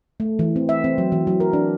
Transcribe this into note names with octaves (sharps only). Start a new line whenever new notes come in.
A3
E3
C4
E5
C4
F#3
E3
F#3
A#4
D4